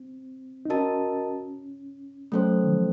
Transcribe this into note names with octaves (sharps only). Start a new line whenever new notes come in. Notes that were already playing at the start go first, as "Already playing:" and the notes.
Already playing: C4
D#4
C#4 F#4 A#4 D#5 A5
F#3 A3 C#4 A4 C5
D#3
F3